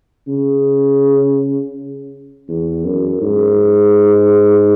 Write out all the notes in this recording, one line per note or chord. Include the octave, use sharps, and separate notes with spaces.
C#3
E2
F#2
G#2